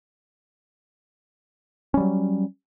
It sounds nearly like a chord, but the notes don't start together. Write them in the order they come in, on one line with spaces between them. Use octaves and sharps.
C#4 G3 F#3